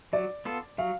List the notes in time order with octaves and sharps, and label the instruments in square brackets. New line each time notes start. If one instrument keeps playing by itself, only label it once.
[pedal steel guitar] F#3 [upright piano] D5
[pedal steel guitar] B3 F4 A4
[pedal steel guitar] F#3 [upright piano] F5